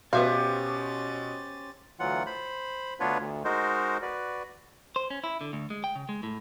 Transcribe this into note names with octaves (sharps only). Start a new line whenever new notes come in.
B2 B3 C#4 G4 C5 E5 F5 A6
D2 E3 F#3 F4 F#5
C5 B5
D2 B3 D4 F4 B4 C#5
D2
G#3 D#4 F#4 A#4 C5
F#4 B4 D5
C5
C#4
E4
D3
D2
G#3
G5
C#3
G#3
A2